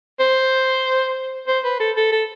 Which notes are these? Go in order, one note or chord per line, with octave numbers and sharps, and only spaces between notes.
C5
C5
B4
A4
A4
A4